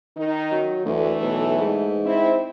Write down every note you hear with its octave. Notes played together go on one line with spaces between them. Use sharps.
D#3 D#4
F#3
D2 E3 A3
B1
G#2
C4 E4